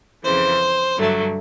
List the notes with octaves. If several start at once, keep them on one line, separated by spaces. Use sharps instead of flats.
F2 C#3 E3 C5
G2 D3 F#3 A3